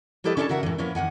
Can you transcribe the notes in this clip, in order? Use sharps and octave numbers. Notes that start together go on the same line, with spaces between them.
F3 E4 G4 A4 B4 D#5
C#4 D4 E4 A4 C#5 A5
C#3 F#4 A#4 E5 F#5
A2 E3
F3 A#3 B3 C#4 E4
E2 D#3 F#5 G#5